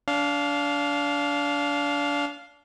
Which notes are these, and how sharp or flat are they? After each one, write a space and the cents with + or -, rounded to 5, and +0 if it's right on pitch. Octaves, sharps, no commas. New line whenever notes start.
D4 -30 F5 +0